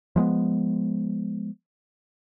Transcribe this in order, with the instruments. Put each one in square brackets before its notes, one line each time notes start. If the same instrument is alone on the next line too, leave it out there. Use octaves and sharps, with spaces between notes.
[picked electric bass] F3 G#3 A#3 B3